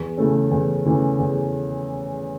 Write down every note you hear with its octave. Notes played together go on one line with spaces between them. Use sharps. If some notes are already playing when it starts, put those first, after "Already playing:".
Already playing: E2
C#3 E3 A3 C#4
E2
C#3 E3 A3 C#4
E2